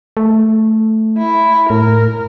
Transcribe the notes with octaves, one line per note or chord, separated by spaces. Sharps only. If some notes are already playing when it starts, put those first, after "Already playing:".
A3
E4
A2 A#4